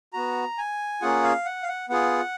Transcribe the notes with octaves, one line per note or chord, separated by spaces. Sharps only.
B3 F#4 A#5
G#5
A#3 C#4 F4 G#4 F#5
F5
F#5
F5
F#5
B3 F4 G#4 F#5